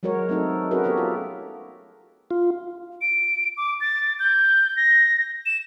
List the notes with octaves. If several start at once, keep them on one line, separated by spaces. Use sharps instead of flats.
F#3 G#3 F#4 A#4 C#5
A3 C4 D#4 A4
C#4 F#4 G#4 A#4 B4
B3 F#4 G4 A4 C#5
F4
F4
D7
D6
A6
G6
A#6
E7